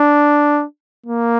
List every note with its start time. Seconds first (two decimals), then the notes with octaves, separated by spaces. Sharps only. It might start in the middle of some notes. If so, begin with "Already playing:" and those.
Already playing: D4
1.06 A#3